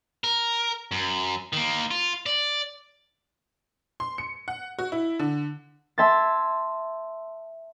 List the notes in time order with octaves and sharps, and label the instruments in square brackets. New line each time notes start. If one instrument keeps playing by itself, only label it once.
[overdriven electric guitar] A#4
F#2
D#3 A#3
F4
D5
[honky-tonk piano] C6
C#7
F#5
F#4
E4
D3
[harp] E5 A5 C6 G#6 A6